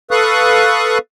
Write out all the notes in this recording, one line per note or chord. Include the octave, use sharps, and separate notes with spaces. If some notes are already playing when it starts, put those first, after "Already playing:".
A4 B4 F5 C#6 D#6 F#6